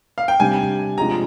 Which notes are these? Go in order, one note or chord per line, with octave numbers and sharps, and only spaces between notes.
F5
G5
C3 G3 D4 G#5
C3 F3 G#3 D4 A#5